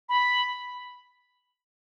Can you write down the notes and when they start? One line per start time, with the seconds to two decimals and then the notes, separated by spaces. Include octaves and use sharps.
0.09 B5